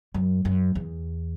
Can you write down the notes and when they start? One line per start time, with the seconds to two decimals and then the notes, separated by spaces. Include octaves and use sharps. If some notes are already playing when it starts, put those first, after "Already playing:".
0.14 F#2
0.45 F#2
0.75 E2